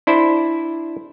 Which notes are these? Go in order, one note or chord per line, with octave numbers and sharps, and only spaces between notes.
D4 E4 C5